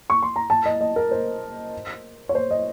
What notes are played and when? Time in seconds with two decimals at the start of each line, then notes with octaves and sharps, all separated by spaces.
0.10 C#6
0.22 C6
0.36 A#5
0.50 A5
0.66 D#5
0.81 D#5
0.96 A#4
1.11 C5
2.29 C#5
2.35 C5
2.51 D#5